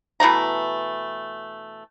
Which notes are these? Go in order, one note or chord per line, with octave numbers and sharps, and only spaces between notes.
B2 E3 A3 A#5